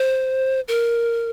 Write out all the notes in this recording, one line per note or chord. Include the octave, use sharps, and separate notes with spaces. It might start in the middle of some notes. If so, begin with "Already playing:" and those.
Already playing: C5
A#4